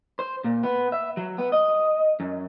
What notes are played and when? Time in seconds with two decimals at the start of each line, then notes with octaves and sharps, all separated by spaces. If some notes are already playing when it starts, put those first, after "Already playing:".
0.19 C5
0.44 A#2
0.63 B3
0.92 E5
1.17 F#3
1.38 B3
1.52 D#5
2.20 F#2